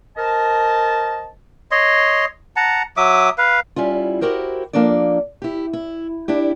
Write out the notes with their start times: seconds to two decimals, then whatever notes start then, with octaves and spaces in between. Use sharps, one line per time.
0.17 A#4 C5 D#5 A5
1.71 C#5 D#5 C6
2.56 F#5 A5 A#5
2.97 F#3 E5 D6 D#6
3.38 B4 F5
3.76 G3 C#4 E4 F4
4.21 E4 F#4 G4 A#4 C5
4.73 F3 A#3 D4 A4 D5
5.42 E4 G4
5.73 E4
6.28 D4 E4 G4